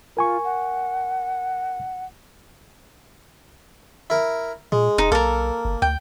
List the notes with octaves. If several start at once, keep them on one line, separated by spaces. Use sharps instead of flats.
F4 A#4 G#5 C#6
F#5
E4 A#4
A#2 G#3
E1 D#4
B1 A#3 A4 A#4
G1
D2 G5